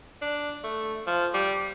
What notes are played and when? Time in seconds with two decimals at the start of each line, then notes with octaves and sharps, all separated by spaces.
0.22 D4
0.64 A3
1.07 F3
1.34 G3